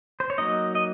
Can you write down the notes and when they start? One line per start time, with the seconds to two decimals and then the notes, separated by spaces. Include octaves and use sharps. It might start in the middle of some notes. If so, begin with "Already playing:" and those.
0.20 C5
0.30 C#5
0.38 F#3 A#3 D#4 D#5
0.75 D#5